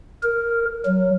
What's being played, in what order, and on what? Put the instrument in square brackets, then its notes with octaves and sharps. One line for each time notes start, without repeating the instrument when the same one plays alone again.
[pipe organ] A#4
F#3